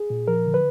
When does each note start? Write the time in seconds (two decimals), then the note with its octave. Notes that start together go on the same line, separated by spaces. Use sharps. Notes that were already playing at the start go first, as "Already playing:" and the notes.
Already playing: G#4
0.10 A#2
0.28 F3 A#4
0.46 D3
0.54 B4